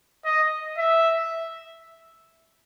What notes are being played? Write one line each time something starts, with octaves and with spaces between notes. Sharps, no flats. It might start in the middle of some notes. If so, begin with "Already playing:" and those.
D#5
E5